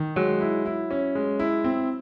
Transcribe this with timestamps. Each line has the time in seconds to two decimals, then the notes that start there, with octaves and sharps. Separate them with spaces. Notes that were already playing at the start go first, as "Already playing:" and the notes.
Already playing: D#3
0.16 F#3 G#3
0.41 E4
0.65 E4
0.91 C#4
1.15 G#3
1.39 E4
1.64 C4